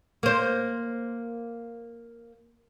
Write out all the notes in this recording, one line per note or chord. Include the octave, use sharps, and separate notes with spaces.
A#3 C5